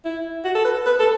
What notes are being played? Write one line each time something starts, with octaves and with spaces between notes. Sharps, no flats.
E4
F#4
A4
B4
B4
A4